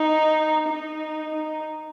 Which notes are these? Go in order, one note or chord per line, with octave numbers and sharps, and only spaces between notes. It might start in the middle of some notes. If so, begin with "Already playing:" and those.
Already playing: D#4
D#4
D#4